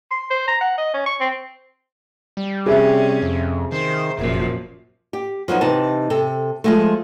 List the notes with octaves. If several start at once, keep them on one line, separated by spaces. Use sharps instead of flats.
C6
C5
A#5
F#5
D#5
C#4
C#6
C4
G3
C3 C#4 G#4 E5
F2
D#3 C5
F1 F#2 A#2 F3
G4
F3 F#3 B3 D#4
C3 E3 D#4 A5
C3 A4
F3 G#3 A3